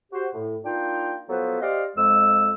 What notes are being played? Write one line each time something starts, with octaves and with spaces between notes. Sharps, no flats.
F#4 G4 C5
A2
A#3 D4 D#4 F4 G5
F3 F#3 B3 A4 B4 C5
G4 C5 D5 D#5 F5
F2 G#3 E6